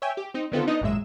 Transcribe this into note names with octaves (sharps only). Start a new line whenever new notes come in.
C#5 E5 G5 G#5
G4
C4 D#4
D3 D#3 B3 C4 F4 A4
B3 D4 D#4 D#5
G#1 F#2 A#2 G#3 E5 E7